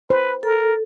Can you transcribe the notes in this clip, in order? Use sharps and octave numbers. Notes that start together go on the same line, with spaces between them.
B4 C5
A4 A#4